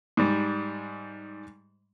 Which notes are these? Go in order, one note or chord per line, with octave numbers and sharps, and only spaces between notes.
G#2 G3